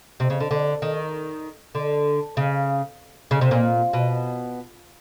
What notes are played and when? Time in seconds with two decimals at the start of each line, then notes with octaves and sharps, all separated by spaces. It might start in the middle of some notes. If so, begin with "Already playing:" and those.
0.20 C3
0.30 C#3
0.40 D3
0.51 D3
0.82 D#3
1.75 D3
2.37 C#3
3.31 C#3
3.41 C3
3.51 A#2
3.93 B2